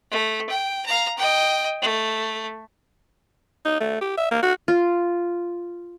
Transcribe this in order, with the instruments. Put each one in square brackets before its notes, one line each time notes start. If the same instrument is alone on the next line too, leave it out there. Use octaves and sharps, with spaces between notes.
[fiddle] A3
G5
F5 A#5
D#5 G5
A3
[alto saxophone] D#4
A3
G4
E5
A#3
F#4
[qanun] F4